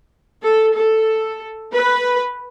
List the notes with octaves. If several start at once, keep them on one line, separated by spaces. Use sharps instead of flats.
A4
A4
B4